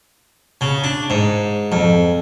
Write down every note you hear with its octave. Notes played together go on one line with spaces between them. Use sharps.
C#3
D4
G#2
F2